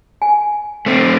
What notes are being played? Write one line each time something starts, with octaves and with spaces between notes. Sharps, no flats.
G#5
A3 C4